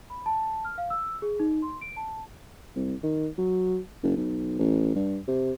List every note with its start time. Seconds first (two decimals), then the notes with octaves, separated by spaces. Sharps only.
0.10 B5
0.26 A5
0.65 F6
0.78 F5
0.90 E6
1.22 G#4
1.40 D#4
1.62 C6
1.81 D7
1.97 A5
2.76 C2
3.03 D#3
3.38 F#3
4.03 F#1
4.17 B1
4.59 A1
4.96 G2
5.28 C3